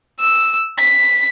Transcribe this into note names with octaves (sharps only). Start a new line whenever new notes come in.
E6
B6